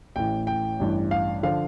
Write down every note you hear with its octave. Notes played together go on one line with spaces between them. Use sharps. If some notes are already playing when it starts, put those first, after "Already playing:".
A1 A2 E3 G5
G5
A1 G2 E3
F5
D3 F3 F5